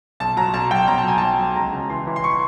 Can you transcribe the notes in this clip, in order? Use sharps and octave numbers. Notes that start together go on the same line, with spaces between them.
B1 A5
F#3 A#5
B1 A5
F#3 G5
B1 A#5
A5
F#3 G#5
F#3 A5
F#3
C#2 A#5
C#3
E3 C6
E3
C6
C#6